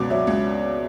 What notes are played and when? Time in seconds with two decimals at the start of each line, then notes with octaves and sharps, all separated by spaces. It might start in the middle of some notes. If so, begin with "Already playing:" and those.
Already playing: C#2 B2 F#3 B4 D5
0.10 F#3 E5
0.27 C#2